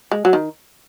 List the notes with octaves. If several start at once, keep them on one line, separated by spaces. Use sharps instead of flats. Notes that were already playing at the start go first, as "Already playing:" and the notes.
G#3
F#3
D#3